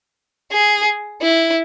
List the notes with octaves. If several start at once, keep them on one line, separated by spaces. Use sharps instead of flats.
G#4
E4